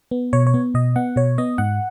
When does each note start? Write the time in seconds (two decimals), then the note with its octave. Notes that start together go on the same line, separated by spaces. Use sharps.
0.11 B3
0.33 B2 C#5
0.47 C#5
0.54 B3
0.74 B2 D#5
0.96 B3 F#5
1.16 B2 C#5
1.38 B3 D#5
1.58 G#2 F#5